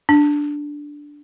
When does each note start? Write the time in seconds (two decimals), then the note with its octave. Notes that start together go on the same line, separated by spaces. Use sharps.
0.09 D4